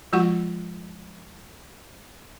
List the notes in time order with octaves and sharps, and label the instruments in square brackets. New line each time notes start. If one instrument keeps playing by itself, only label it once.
[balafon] F3 G#3 F4 F#4 F#5 C#6